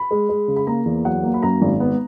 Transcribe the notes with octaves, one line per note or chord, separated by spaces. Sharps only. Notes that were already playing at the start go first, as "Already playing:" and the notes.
Already playing: B5
G#3
G#3
C#3
B5
A#3 A#5
E2
F#3 F#5
A#3
B5
F#2 A#5
G#1
B3